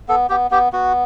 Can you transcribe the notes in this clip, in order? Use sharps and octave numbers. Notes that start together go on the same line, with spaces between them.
B3 A4
B3 G4
B3 G4
B3 F#4